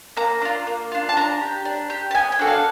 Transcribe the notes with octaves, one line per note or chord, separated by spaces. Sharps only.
A#3 A#5
D4 F4
A#3
D4 F4
A5
D4 A#5
G4
D4
G4
A5
B3 G#5
G5
D4 F#4 A4
F5